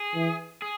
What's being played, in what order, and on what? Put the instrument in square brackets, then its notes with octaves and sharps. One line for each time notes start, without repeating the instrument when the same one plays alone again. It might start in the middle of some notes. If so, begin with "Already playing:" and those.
Already playing: [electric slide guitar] G#4
[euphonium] E3
[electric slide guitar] G#4